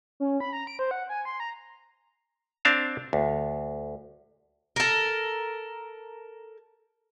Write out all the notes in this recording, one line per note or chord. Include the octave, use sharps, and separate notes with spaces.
C#4
B5
A#5
D7
C5
F#5
G#5
C6
A#5
C4 D4 F5 A5
D2
A4 A#4